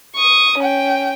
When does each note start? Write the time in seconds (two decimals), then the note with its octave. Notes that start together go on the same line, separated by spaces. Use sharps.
0.15 C#6 D#6
0.58 C#4 G5